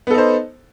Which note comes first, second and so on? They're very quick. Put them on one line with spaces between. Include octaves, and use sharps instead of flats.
B3 A4 D#4 C5